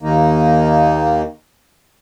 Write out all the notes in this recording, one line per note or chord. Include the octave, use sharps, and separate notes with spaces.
D#2 D#3 A#3 D#4